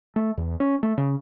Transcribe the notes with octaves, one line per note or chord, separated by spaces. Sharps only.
A3
E2
C#4
A3
C#3